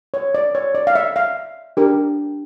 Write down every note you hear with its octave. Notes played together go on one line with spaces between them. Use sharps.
C#5
D5
C#5
D5
F5
E5
F5
D4 G4 A#4